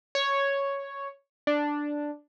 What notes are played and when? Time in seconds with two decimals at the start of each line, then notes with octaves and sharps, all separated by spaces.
0.15 C#5
1.47 D4